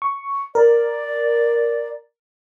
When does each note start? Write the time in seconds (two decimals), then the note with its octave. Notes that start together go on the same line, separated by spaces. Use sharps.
0.02 C#6
0.55 A#4 D5